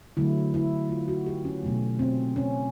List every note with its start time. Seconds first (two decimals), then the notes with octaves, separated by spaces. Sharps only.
0.17 D3 F#3 A3 E4
0.54 E4
0.90 F4
1.08 F#4
1.26 G4
1.45 C#4
1.63 B2 F#3 A3
1.99 C4
2.36 C#4